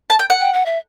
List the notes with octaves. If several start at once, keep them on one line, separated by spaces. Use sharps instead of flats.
A5
G5
F#5
G5
F#5
E5